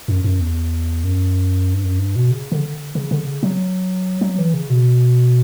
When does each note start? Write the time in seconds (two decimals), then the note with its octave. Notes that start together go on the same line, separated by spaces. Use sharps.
0.08 F#2
0.24 F#2
0.40 E2
1.04 F#2
1.74 G2
1.84 F#2
1.99 G2
2.16 B2
2.31 C#3
2.52 D3
2.95 C#3
3.11 D3
3.27 C#3
3.43 F#3
4.21 F#3
4.38 E3
4.54 C#3
4.70 B2